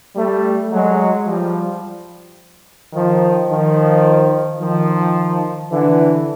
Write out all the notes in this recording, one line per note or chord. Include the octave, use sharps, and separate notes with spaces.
G3 A3
F#3 G#3
F3 G3
D#3 F3
D#3 F3
D#3 F3
D3 E3